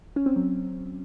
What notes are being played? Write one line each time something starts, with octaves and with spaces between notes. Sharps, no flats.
C#4
C4
F#3